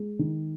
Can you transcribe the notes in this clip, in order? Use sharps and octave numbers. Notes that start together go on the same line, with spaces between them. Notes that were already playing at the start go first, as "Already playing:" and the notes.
Already playing: G#3
D#3